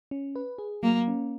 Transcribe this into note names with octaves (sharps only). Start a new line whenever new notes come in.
C#4
B4
G#4
F#3 A#3
C#4